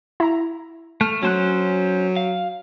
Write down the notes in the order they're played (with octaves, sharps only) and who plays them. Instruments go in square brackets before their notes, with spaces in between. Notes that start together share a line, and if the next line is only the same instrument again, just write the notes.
[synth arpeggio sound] E4 A#5
[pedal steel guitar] A3 [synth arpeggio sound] F6
[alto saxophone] F#3 [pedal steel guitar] C#4 C5 F#6
[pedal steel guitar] F5